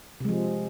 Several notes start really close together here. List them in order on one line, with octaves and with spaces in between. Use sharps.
C3 G#3 F3